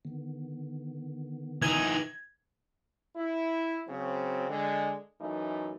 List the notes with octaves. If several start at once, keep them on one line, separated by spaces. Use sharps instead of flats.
D3 D#3 B3
E3 D#4 G#6
E4
C#3 F#3 C4
D3 G#3
F#2 E3 A3 D#4